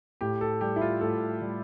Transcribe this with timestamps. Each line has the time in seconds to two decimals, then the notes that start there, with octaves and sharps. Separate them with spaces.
0.21 A2 G4
0.41 A4
0.61 G3 G4
0.76 E4
0.81 F4
1.01 A2 A4
1.41 G3